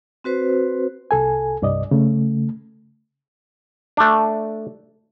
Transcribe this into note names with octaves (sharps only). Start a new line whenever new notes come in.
C4 F#4 B4 C5
C2 A4 G#5
C2 G2 D5 D#5
C#3 A3
A3 D4